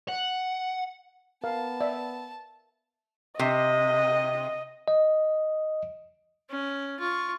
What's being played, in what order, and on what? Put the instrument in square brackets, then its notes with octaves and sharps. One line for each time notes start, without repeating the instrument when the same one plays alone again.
[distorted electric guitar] F#5
[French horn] B3 [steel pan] A#4 F5 [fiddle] A5
[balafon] D5 [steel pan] E5
[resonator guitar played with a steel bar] C3 [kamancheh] D#5
[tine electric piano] D#5
[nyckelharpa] C#4
F4 C#6